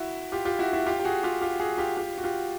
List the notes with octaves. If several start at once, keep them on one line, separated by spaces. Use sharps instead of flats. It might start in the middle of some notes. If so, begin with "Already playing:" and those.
Already playing: E4 F#4
F4 G4
F4 G4
E4 F#4
E4 F#4
F4 G4
G4
F#4 G#4
F4 G4
F4 G4
F#4 G#4
F4 G4
F4 G4
F#4
F4 G4